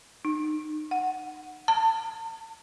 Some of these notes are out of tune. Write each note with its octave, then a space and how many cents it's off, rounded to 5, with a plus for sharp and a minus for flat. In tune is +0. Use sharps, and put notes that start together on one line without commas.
D#4 -30
F#5 -5
A5 +40